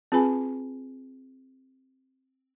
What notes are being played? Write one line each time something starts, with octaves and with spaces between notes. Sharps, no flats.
C4 F4 G#4 B4 G#5 B5